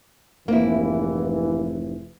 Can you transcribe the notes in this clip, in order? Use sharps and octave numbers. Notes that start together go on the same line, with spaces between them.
F1 G#2 C3 E3 A#3 E4